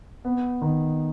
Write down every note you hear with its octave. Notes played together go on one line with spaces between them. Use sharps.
B3
D#3